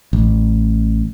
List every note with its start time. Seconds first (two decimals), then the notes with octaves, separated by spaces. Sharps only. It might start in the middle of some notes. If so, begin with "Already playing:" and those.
0.13 A1